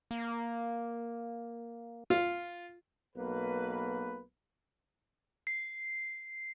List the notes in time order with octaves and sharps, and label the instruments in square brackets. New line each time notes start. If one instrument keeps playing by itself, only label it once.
[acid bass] A#3
[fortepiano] F4
[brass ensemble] B1 B2 A#3 B4
[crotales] C7